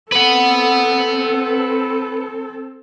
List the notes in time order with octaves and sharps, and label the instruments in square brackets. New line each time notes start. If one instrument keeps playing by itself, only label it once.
[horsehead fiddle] C4 A4 [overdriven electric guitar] B4 F#5